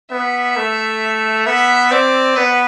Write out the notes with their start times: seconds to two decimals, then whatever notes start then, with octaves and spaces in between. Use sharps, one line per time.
0.11 B3 E5
0.57 A3
1.46 B3 E5
1.91 C4 D5
2.36 B3 B4